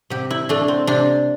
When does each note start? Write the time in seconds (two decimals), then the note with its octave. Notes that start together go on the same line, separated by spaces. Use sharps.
0.10 C3 G4
0.31 E4
0.49 A3 D4
0.68 C4
0.87 C3 D4